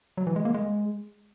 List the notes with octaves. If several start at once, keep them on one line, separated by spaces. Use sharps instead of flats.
F#3
E3
G#3
A#3
G#3